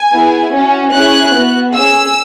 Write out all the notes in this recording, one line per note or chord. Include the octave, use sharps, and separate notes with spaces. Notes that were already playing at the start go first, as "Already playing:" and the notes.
Already playing: G#5
B3 E4 G#4
C#4 F#4
C#4 E4 G#4 F#6
B3 F#4
C#4 G#4 E6